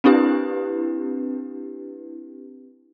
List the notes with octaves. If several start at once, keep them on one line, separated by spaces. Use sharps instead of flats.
C4 D4 E4 G4 B4